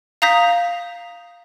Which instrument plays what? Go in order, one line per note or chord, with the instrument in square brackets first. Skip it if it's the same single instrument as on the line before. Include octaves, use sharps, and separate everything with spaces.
[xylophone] F5 A#5 D#6 G6 A#6 B6